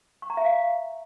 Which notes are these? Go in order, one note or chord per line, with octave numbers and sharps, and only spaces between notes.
C#6
A#5
E5
F5